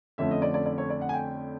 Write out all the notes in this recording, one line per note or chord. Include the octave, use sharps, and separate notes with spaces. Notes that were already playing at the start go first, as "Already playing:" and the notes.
F2 D3 F3 A3 C#4 E5
D#5
D5
D5
D5
C#5
D5
F#5
G#5
G5